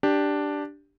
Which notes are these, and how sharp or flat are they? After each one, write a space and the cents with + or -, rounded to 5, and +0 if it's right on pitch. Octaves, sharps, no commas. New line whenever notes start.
D4 +0 G4 +0